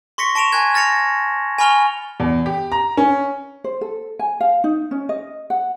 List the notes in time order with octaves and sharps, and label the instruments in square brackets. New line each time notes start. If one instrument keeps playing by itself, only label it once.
[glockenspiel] C6 C#6 A#6 B6 C#7
A5 C#6 D7 E7 F7
G#5 A5 F#6 G#6 F7
F6 A6 A#6 C#7 F7
G#5 B5 C#6 F6 F7 G7
[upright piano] E2
G4
A#5
C#4
[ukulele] C5
A4
G#5
F5
D#4
C#4
D#5
F#5